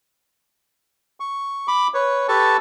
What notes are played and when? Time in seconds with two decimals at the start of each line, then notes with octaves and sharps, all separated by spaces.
1.20 C#6
1.68 B5 D6
1.94 B4 C#5
2.28 G4 A4 B4 A5 C#6